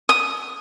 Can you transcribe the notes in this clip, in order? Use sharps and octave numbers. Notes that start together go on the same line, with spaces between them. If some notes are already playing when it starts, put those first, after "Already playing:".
D#6